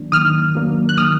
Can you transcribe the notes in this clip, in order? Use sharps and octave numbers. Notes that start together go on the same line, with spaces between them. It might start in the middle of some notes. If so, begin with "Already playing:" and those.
Already playing: D#3 F#3 A#3 D4
D#3 D#6 F6
F#3 A#3 D4
F#6
D#3 D#6 F6